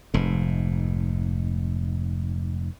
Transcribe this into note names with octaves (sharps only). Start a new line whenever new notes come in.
F1 G#2